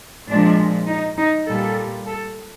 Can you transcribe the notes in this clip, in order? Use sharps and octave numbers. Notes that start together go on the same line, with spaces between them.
A#2 F3 G#3 D4
D#4
D#4
A#2 G3 A4
A4